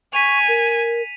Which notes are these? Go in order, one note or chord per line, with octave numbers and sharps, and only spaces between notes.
G#5 C#6 B6 D#7 F7
A#4